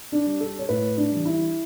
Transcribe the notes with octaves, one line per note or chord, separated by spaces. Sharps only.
D4
G3
A4
C#5
A2 B4
D4
E3 G3
E4